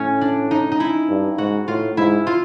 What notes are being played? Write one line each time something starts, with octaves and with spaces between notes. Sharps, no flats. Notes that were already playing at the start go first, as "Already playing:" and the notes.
Already playing: A2 C#4
D4
D#4
D#4
E4
G2
G#2 F#4
A2 F4
G#2 E4
F4